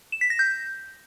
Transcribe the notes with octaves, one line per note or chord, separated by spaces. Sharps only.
E7
B6
A#6
G6